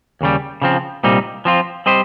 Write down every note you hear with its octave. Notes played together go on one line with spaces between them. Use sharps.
D#2 C#3 G3
C#3 F3 C4
C2 A#2 G3 C4 D#4
F3 C4 F4
G3 C4 G4 C5 D#5